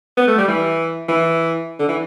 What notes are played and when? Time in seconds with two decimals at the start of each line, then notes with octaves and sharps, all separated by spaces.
0.17 B3
0.27 A3
0.38 G3
0.48 E3
1.08 E3
1.79 D3
1.89 E3